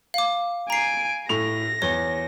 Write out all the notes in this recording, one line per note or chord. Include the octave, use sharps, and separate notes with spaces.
F5 D6
G#5 A#5 C7 D7
A2 A#6 F7
E2 C#5 G7